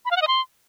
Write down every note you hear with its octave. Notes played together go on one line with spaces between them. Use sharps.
B5
F5
F#5
D#5
C6